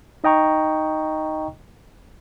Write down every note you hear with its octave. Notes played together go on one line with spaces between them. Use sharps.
D#4 D#5 G5 A#5 C#6